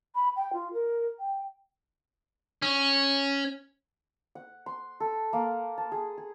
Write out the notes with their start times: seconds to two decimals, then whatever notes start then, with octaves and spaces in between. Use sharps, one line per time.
0.15 B5
0.36 G5
0.53 F4
0.73 A#4
1.20 G5
2.62 C#4
4.35 F#5
4.66 C6
5.00 A4
5.33 A#3
5.78 A5
5.92 G#4
6.18 G#4